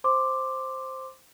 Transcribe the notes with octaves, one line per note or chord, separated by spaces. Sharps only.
C5 C6 D6